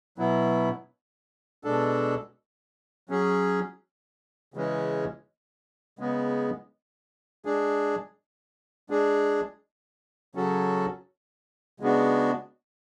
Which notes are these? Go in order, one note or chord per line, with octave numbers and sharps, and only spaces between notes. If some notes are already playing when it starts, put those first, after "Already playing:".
B2 F#3 B3 E4
B2 G#3 D4 A4
F#3 C#4 G#4
C#3 E3 G#3 C#4
C#3 G#3 B3
G#3 D4 G#4
G#3 D4 G#4
C#3 F#3 C#4 F#4 A4
C#3 G#3 B3 D4 F#4